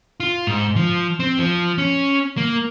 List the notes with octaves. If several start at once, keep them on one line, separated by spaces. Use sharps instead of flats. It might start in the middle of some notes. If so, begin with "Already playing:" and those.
F4
G#2
F3
C4
F3
C#4
A#3